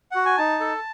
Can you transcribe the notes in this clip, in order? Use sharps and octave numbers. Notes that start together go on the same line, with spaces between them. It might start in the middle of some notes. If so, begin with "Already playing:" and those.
F#4 F#5
G#5
D#4 A5
A4